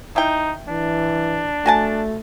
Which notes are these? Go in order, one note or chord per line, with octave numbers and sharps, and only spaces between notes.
D#4 E4 G5
E3 D4
A3 F#4 G#5 A5